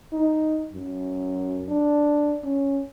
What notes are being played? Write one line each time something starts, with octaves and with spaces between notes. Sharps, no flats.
D#4
F#2
D4
C#4